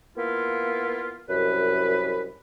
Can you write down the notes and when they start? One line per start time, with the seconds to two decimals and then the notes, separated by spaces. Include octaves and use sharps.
0.17 A#3 B3 E4 F4
1.29 C2 F#2 B4